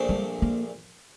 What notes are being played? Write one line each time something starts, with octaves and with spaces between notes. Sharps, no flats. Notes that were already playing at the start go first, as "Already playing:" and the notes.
Already playing: A#1 A#2 F3 A3 D4
G3
A#3